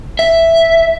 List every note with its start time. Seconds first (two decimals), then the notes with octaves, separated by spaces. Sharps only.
0.19 E5